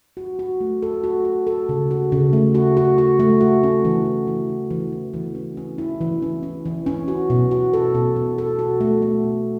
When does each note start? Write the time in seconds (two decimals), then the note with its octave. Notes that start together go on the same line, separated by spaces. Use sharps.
0.17 F#4
0.39 F#4
0.61 A3
0.83 A4
1.04 F#4
1.25 F#4
1.47 A4
1.69 C#3
1.91 F#4
2.12 C#3
2.33 A3
2.55 F#4
2.77 F#4
2.98 F#4
3.20 A3
3.41 F#4
3.63 C#4
3.85 E3
4.05 E3
4.27 E3
4.49 E3
4.71 E3
4.92 E3
5.14 E3
5.35 C#4
5.57 C#4
5.78 E4
6.01 E3
6.22 C#4
6.43 C#4
6.66 E3
6.86 C#4
7.08 F#4
7.30 B2
7.51 F#4
7.73 A4
7.95 B2
8.16 B2
8.38 A4
8.59 F#4
8.81 A3
9.02 A3
9.24 B2